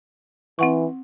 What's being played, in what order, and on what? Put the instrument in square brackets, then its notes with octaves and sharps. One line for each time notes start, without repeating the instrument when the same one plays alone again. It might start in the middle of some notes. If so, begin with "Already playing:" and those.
[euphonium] E3 [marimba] C4 F#5 C#6